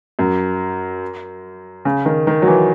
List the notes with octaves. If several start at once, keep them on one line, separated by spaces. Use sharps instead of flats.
F#2
C#3
D#3
D#3
F#3
E3